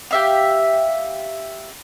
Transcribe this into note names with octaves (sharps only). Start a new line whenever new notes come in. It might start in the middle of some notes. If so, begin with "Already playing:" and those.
G4 E5 F5